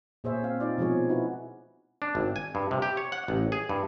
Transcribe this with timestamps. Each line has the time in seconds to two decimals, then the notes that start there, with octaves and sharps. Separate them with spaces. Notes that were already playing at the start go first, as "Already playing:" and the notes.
0.24 A#2 G#4 C5 C#5 E5
0.44 C4 F5
0.60 D#4 F4 D5
0.78 B2 F3 G#3 C4 G#4 C#5
1.09 D#4 E4 F#4 B4
2.02 D4
2.15 G#1
2.36 G#5
2.55 G2
2.71 C3
2.82 G4
2.97 C#5
3.12 F#5
3.28 A1
3.52 G#4
3.69 G2